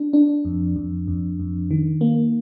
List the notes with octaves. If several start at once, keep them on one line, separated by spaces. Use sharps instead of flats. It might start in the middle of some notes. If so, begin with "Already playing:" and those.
Already playing: D4
D4
F2
F2
F2
F2
D#3
A#3